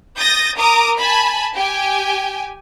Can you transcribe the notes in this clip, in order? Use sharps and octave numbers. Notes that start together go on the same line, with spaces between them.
D#6 G6 A6 A#6
A#4 A#5 D6 D#6
G#5 A5 B5
G4 G5 G#5